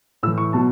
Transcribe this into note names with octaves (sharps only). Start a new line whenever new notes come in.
A2 E3 E6
C#6
B2 F#3 A5